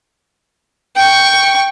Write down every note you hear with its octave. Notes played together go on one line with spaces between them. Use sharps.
G5 C#6